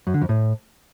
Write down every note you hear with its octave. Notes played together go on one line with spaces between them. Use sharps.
F#2
D3
F2
A2